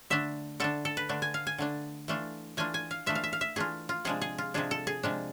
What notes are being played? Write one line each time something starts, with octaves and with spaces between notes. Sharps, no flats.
D3 A3 D4 E5
D3 A3 D4 A4
A4
B4
D3 A3 D4
G#5
F5
G#5
D3 A3 D4
E3 A3 D4 F4
E3 A3 D4 F4 G#5
G#5
F5
E3 A3 D4 F4 E5
F5
E5
F5
E5
E3 A3 D4 F4 G#4
F4
C3 F3 G#3 D4 G#4
G#4
F4
C3 F3 G#3 D4 G#4
A4
G#4
C3 F3 G#3 D4